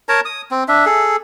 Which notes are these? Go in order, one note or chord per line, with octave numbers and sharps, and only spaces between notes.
A#4 C#5 A5 A#5
D#6
C4
D4 E5
G#4 A4